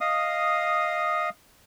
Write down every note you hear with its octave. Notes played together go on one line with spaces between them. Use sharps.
D#5 F5 D#6